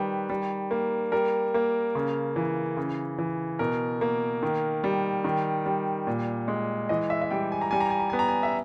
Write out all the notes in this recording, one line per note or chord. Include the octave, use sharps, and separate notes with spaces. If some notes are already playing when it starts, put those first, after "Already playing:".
Already playing: D#3 G3 B4
G3
A#3
G3 A#4
A#3
C#3
E3
C#3
E3
B2 A#4
A#3
D#3
G3
D#3
G3
A#2
G#3
E3 D#5
E5
E5
G3 G5
G#5
A#5
G3 G#5
A#5
G#5
A#5
B3 G#5
A#5
G#5
E5